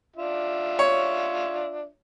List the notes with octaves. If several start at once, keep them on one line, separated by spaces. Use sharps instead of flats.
D4 F4 E5
C#5